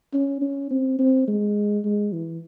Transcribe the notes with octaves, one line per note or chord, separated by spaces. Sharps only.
C#4
C#4
C4
C4
G#3
G#3
E3